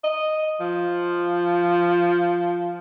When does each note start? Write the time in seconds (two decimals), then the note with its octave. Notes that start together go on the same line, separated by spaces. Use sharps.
0.04 D#5
0.60 F3